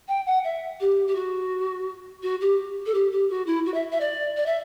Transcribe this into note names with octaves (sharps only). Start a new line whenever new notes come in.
G5
F#5
E5
G4
G4
F#4
F#4
G4
A4
G4
G4
F#4
E4
F#4
E5
E5
D5
D5
E5